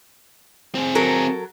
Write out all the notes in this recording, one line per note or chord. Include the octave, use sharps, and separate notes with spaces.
C4 G#4
F#3 A4 A#4